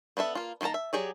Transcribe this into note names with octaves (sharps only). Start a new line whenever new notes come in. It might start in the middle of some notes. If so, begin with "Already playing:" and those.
B3 D4 A4 E5
A#3 F4
D#3 A#3 B3 A5 A#5
E5
F#3 G4 G#4 D5